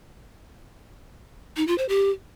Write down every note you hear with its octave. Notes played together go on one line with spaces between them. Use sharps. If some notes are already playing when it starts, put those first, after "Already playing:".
D#4
F4
C5
G4